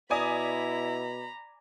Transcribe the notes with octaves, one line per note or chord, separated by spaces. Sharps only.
B2 E4 D5 G#5 A#5 B5 D#6